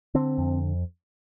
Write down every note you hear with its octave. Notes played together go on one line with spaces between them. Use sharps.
D3 C4
F2